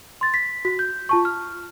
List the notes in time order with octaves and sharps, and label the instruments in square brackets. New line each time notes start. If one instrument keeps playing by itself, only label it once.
[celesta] C6 A6
B6
F#4 B6
G6
F4 A5 C#6
F6